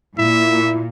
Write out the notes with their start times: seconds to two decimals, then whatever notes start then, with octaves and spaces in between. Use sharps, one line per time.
0.18 A#2 E4 E5